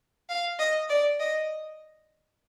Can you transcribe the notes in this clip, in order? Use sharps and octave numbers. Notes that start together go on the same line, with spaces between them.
F5
D#5
D5
D#5